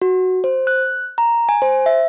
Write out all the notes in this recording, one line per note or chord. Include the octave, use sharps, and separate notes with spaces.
F#4
C5
F#6
A#5
G#5
C5
E5